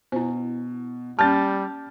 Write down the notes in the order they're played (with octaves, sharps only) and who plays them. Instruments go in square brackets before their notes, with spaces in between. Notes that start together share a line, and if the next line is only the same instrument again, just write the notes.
[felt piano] B2 [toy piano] D4 E4 [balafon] C5
[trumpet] G3 [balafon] A#3 C#4 [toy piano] A5 [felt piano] F6 G6 A6